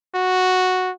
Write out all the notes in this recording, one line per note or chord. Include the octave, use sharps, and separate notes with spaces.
F#4